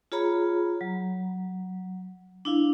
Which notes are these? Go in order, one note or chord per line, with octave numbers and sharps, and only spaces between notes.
F4 G#4 C#5 A#5 B5
F#3
D4 E4 F5